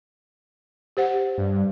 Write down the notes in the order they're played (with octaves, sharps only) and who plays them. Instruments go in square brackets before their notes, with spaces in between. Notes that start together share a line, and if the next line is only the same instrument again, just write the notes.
[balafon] G4 C5 F#5
[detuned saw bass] G2